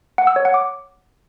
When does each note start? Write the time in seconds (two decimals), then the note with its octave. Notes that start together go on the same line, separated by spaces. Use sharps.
0.18 F#5
0.27 E6
0.36 C#5
0.45 F#5
0.54 D6